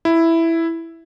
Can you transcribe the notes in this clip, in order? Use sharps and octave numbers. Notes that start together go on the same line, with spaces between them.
E4